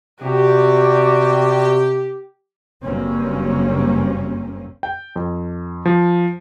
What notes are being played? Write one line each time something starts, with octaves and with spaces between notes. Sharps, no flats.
C3 F#4 G4 D5
F#1 G2 A#3 C4 C#4
G5
F2
F3